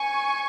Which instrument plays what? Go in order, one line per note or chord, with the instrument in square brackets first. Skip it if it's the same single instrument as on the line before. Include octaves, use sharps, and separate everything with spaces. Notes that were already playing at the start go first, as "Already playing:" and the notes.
Already playing: [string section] G#5 C#6